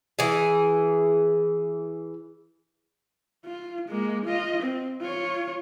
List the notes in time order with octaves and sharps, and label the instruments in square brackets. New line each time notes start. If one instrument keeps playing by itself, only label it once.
[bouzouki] E3 G#4
[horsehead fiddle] F4
G#3 A#3
F4 D#5
C4
F4 C#5